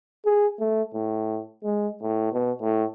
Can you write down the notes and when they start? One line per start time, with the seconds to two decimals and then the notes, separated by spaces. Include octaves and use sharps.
0.25 G#4
0.60 A3
0.94 A2
1.64 G#3
2.02 A2
2.32 B2
2.62 A2